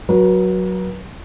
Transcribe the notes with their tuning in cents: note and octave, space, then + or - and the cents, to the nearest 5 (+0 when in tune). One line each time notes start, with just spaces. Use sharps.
F#3 +0 B4 -40